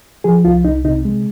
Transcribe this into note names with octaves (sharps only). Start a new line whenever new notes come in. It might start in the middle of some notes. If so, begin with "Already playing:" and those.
F3 G#4
C2 F4
C2 D#4
C3 D#4
G#3